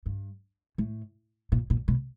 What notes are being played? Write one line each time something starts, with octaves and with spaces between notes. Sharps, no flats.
G2
A2
A#2
A#2
B2